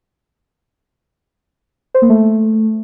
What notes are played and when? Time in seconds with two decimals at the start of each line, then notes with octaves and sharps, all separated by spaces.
1.95 C5
2.02 A#3
2.09 A3